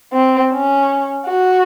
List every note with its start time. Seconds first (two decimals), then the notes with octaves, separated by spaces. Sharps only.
0.13 C4
0.51 C#4
1.26 F#4